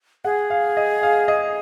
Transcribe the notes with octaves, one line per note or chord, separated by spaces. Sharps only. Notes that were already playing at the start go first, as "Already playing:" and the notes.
G#4 F#5
F5
D#5
F5
D#5